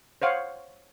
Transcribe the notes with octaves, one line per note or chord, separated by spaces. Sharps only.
C5 C#5 F5 F#5